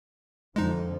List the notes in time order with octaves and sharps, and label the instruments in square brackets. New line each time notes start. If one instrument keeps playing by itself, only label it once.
[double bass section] F2 D3 F3 [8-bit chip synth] G#3 D#4